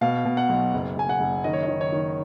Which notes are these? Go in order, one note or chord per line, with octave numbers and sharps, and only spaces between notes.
B2 F5
B2
F#5
B1
F#1
F#1 G#5
F#5
F#1
D#3 D#5
C#5
D#5
D#3
C#5
D#3